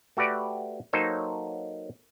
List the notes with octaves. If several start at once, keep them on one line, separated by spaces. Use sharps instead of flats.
A3 F#4 G4 B4 D5
F#3 A#3 D#4 A4 C5 C#5